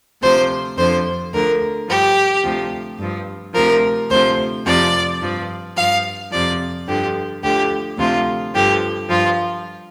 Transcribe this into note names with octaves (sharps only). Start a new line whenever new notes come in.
D2 C3 F3 C5
F2 D3 F3 C5
D2 D3 F3 A#4
G2 F3 G4
D2 C3 F3
G2 F3
D2 C3 F3 A#4
D2 C3 F3 C5
F2 C3 F3 D5
G2 F3
G2 F3 F5
F2 C3 F3 D5
G2 D3 F3 G4
D2 D3 F3 G4
D2 C3 F3 F4
G2 D3 F3 G4
G2 F3 F4